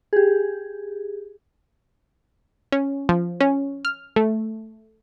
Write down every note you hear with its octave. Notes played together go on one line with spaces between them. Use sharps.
G4 G#4
C#4
F3
C#4
F6
A3